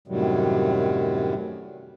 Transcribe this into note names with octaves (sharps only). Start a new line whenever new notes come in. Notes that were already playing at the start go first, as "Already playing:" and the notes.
F#2 A2 C3 D#3 F#3 G3